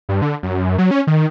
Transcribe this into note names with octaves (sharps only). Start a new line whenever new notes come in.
G2
D3
F#2
F#3
C#4
D#3